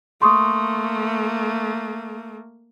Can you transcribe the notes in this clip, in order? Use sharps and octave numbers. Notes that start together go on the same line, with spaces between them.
A3 A#3 C6 C#6 D#6